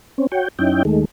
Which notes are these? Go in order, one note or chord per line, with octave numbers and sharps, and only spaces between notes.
C4 C#4
F#4 C#5 G5
F#2 C#4 D#4 E4 G5
D#2 D#3 G#3 A3